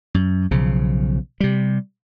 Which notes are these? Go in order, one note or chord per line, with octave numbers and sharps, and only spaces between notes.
F#2
B1 C#3 F3
C3 G3